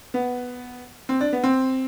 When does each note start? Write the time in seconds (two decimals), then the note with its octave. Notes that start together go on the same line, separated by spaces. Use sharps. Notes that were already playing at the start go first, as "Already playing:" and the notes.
0.14 B3
1.09 C4
1.21 D4
1.33 B3
1.43 C4